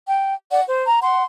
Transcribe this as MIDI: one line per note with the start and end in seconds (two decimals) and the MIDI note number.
0.07 0.33 79
0.50 0.61 74
0.50 0.61 78
0.68 0.84 72
0.86 0.99 82
1.01 1.22 78
1.01 1.22 84